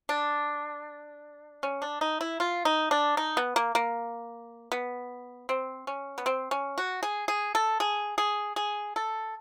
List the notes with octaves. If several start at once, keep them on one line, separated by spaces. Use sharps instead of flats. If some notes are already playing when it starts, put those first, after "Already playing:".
D4
C#4
D4
D#4
E4
F4
D#4
D4
D#4
B3
A#3
A#3
B3
C4
C#4
B3
C4
C#4
F#4
G#4
G#4
A4
G#4
G#4
G#4
A4